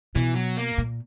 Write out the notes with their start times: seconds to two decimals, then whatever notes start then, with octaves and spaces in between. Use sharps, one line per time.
0.15 B2 E3
0.35 F#3
0.57 A#3
0.78 A#2